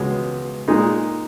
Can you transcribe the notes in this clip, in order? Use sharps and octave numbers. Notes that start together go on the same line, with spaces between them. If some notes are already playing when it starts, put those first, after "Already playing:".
Already playing: C#2 B2 G#3 B3
A#2 G#3 D#4